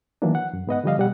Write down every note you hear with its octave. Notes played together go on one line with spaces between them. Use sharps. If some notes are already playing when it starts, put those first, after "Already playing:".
D#3 E3 F#3 A#3 B3 D4
F#5
F#2
G#2 B3 D#5 F#5
D3 F3 G3 D5 D#5 F5
B2 G3 F#5